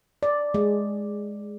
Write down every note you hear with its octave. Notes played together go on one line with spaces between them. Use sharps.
D5
G#3